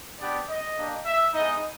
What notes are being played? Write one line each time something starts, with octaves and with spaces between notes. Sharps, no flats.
B3 D4 G4 D5
D#5
A#3 D4 G4
E5
G#3 B3 D#4 D#5